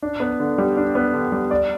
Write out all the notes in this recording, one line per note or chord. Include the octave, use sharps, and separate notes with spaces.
D4
B3
D3
G3
D4
B3
D3
G3
D5